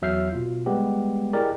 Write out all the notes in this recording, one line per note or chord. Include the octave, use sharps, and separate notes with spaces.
E2 F#3 E5 F6 G6 C7
B2 F4
G3 G#3 B3 G4
E4 G4 G#4 A#4 D5 D#5